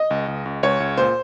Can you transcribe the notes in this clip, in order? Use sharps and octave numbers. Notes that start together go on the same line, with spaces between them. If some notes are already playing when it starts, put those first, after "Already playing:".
Already playing: D#5
C#2
C#2
C#2
C#2 C#5
C#2
A#2 C5